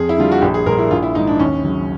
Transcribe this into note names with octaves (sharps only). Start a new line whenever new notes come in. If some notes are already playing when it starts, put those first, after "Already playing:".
Already playing: F2 G#4
E4
D3 G3 F4
F#4
A#1 G4
G#4
A#2 G3 A#4
E4
A#1 F4
E4
G#2 D#3 D#4
D4
D#2 C#4
C#3 F#3